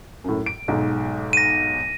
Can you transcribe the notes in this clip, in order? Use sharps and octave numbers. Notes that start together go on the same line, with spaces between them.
F#2 A2
D7
B1 G#2
A#6 D#7